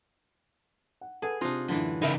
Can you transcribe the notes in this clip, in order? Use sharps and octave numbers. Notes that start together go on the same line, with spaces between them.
F#5
G#4 A4 B4 F#5
C3 C4 D4 D#4 F4
F#2 A2 D3 E3 D4
C#3 D#4 E4 A#4 E5